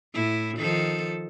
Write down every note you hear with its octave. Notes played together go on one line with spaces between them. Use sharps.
A2 E4
D#3 F3 A4